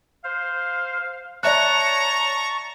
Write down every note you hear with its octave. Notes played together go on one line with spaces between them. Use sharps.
C5 F5
C#5 D5 E5 A5 A#5 C#6 F#6